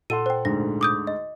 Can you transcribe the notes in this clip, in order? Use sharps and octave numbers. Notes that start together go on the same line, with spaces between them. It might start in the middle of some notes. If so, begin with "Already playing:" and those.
A#2 A4 F#5 C6 D#7
C5 G5
D2 G#2 D3 A#6
D6 D#6 G6
D#5